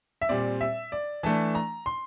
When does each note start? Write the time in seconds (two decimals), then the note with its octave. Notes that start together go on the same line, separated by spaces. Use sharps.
0.22 E5
0.29 A#2 G3 C4 D5
0.61 E5
0.92 D5
1.23 E3 A3 D4 A5
1.55 A#5
1.86 C6